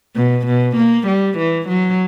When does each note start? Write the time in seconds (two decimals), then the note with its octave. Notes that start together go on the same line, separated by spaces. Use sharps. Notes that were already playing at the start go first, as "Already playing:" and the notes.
0.16 B2
0.46 B2
0.77 A#3
1.07 G3
1.38 E3
1.68 F#3